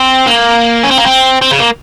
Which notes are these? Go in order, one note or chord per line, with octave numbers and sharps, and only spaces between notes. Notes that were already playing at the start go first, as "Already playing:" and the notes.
Already playing: C4
A#3
C#4
C4
A#3
C4
C4
C#3
A#3